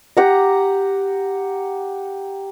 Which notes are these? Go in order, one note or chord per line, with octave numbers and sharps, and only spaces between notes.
G4 F#5 A#5